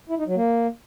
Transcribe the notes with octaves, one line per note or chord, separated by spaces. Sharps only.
E4
D#4
F#3
A#3